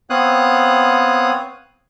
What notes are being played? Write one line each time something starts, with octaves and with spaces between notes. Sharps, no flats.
B3 C4 C#5 F5 D#6 F#6